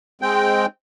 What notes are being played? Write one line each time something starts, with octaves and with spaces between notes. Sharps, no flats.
G#3 C4 G5